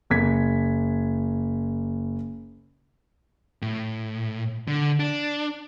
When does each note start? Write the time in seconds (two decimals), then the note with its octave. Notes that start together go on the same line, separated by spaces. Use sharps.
0.10 F#1 G#6 B6
3.62 A2
4.68 D3
4.99 D4